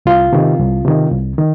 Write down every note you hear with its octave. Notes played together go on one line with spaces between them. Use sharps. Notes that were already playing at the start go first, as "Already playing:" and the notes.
C2 F4
C3 D#3
C2
C3 D#3
C2
D#3